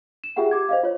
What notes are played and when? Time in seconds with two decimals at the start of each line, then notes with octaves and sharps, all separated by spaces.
0.24 E7
0.36 F4 G4 G#4 E5 F#5 G5
0.51 G4 D6 G#6
0.69 C5 D#5 F5
0.83 F4 C#5